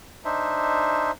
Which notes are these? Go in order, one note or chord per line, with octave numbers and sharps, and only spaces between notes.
D4 D#4 C5 E5